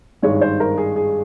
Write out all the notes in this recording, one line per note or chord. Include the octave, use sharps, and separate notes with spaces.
G#1 G2 D#3 G#3 C#5
C5
A#4
G#4
G#4